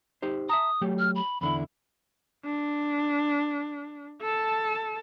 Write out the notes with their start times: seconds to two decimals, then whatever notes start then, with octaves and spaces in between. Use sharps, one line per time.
0.22 D#4 G4 C5
0.49 E5 A5 A#5 D#6
0.82 F#3 A3 G4
0.99 F6
1.16 B5
1.41 E2 D3 E4 B5
2.45 D4
4.22 A4 A5